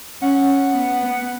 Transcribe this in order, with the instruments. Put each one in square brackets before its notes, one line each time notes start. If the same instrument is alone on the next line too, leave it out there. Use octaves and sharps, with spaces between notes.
[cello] C#4 [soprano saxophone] F#5
[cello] B3